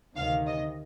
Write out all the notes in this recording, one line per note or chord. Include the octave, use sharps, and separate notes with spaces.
D2 C3 D#3 F5
D#5